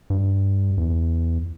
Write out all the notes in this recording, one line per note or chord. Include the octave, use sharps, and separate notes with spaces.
G2
E2